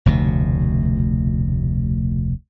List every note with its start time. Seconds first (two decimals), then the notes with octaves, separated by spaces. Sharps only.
0.06 F1 D2 B2